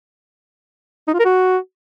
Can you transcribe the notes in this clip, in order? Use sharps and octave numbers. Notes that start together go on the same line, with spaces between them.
D#4
F4
A#4
F#4